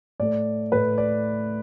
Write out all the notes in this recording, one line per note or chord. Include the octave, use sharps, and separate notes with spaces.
A2 A3 D5
A2 A3 B4
D5